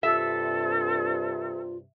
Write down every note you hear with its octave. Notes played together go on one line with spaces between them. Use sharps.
G2 C3 F4 A4 E5